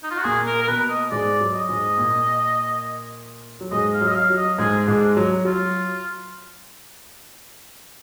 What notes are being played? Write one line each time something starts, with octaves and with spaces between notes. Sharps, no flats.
D#4
F4
F#4
A#2 A#3 G#4
A#4
A#4
B2 B3 B4
D#5
G#2 G#3 D5
F#3
D#5
G#2 G#3
A#2 A#3
F#3
G#2 G#3 D#5
F5
F#3
D#5
F5
F#3
D#5
G#2 G#3 G#4
G#2 G#3 D4
F#3
F#3 F4